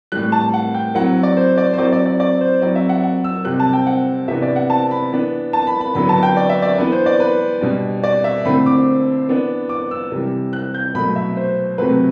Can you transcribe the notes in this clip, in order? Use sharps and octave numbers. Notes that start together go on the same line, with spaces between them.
A2 E3 G3 F#6
A5
F#5
G5
F#3 C4 E4 F#5
D5
C5
D5
C5
F#3 C4 E4 D5
D5
D5
D5
C5
F#3 C4 E4 D5
E5
F#5
F#5
E6
C3 G3 C4 F#6
A5
G5
F#5
C3 E3 B3 D4 E5
D5
F#5
A5
B5
E3 B3 D4
A5
B5
B5
D3 F#3 B3 E4 B5
A5
G5
D5
E5
D5
E3 B3 D4 B4
C5
D5
B4
B2 G3 D4
D5
E5
D3 A3 C4 E4 B5
D6
E3 B3 D4
D6
E6
C3 E3 G3
F#6
G6
B2 F#3 A3 B5
E5
C5
C3 F#3 A3 C4 B4